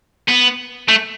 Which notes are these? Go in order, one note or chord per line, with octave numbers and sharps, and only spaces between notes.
B3
A3